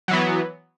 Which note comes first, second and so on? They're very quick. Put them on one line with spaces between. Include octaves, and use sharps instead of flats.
F#3 E3 B3